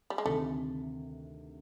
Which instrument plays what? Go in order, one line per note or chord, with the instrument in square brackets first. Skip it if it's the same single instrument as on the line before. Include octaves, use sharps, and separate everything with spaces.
[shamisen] G3
G#3
[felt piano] D2 C3 D#3 [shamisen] A3